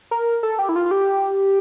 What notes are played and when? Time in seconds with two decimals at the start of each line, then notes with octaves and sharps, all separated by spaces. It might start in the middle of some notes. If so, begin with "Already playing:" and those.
0.11 A#4
0.43 A4
0.59 G4
0.69 E4
0.76 F4
0.86 F4
0.91 G4